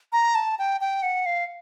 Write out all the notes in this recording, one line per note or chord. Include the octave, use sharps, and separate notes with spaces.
A#5
A5
G5
G5
F#5
F5